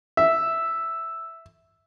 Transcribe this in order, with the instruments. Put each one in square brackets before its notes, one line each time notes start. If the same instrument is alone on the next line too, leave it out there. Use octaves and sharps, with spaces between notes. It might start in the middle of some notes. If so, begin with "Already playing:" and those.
[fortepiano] E5 [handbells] E6